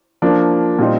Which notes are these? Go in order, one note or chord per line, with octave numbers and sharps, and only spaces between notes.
F3 A#3 D4
A#2 G3 C4 D#4